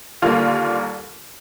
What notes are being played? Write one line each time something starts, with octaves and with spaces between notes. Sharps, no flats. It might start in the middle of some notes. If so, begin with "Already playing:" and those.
D#2 D3 G3 A#3 F4